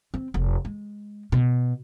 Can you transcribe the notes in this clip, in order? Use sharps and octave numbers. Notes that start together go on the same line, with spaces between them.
C4
F1
G#3
B2